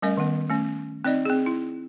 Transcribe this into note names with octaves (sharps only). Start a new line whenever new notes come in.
G3 A3 C#4 A#4 D#5
D#3 B3
A3 C#4
C4 D#4 D5 D#5
C4 G#4
E4